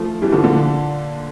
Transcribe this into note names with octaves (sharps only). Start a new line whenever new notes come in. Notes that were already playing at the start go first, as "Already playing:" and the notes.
Already playing: F3 A3
E3 G3
D3 F3
A#2 D3